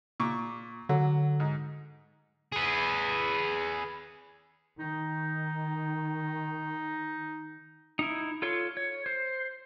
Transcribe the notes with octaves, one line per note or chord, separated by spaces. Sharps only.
A#2 C#6 D6
D3 F#3
G#2
G#4 B4
D#3 D#4
D#4 E4
F4 A4 C#5 C6
C#5
C5